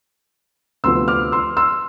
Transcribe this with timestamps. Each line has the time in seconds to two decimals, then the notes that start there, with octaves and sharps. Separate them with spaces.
0.84 D2 C3 F3 B3 C6 E6
1.08 D6 F6
1.32 C6 E6
1.57 C6 E6